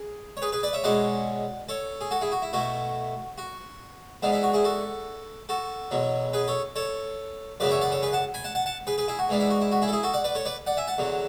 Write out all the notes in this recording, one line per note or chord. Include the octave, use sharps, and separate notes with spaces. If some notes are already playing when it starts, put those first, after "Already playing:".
Already playing: G#4
C#5
G#4 B4
G#4 B4
B4 D5
C#5 E5
B2 G#3 C#4 E4 D5 F#5
A4 C#5
G#4
F#4 A4
E4 G#4
F#4
E4
B2 A3 E4 F#4
F#4
G#2 E3 B3 D4
E4
F#4
E4 G#4
F#4 A4
F#4 A4
E2 B2 F#3
G#4 B4
A4 C#5
A4 C#5
F#2 C#3 E3 B3 D4 B4 D5
C#5 E5
D5 F#5
A4 C#5
G#4 B4
F#5 A5
G#5 B5
F#5 A5
F#5 A5
F#5 A5
G#4 B4
G#4 B4
E4 G#4
F#4
G#2 E3 B3 D4
E4
F#4
E4
F#4
E4 G#4
A4
E4 G#4
F#4 A4
D5 F#5
B4 D5
A4 C#5
B4 D5
D5 F#5
E5 G#5
F#5 A5
E2 D3 F#3